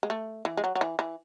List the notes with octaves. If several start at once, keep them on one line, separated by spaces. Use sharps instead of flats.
G#3
A3
E3
G#3
F#3
F#3
E3
E3